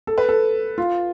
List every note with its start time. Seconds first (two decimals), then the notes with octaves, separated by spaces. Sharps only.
0.07 A4
0.18 B4
0.29 A4
0.78 F4